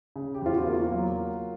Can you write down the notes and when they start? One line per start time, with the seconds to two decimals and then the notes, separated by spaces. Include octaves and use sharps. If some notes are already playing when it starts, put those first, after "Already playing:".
0.16 C#3
0.34 G4
0.42 E2 F4
0.54 F#4
0.67 A#3
0.73 F4
0.92 F#3